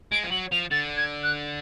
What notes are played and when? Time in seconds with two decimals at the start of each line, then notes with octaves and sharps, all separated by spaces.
0.12 G#3 D7
0.23 F3
0.31 F#3 F#7
0.52 F3 F7
0.71 D3 A6
0.97 G#6
1.23 F#6